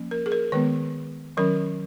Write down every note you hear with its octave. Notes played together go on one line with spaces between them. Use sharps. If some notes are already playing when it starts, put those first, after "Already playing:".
Already playing: F3 A#3 C#4
A#4
G#4
A#4
D#3 G#3 B3 B4
D#3 F#3 C#4 A#4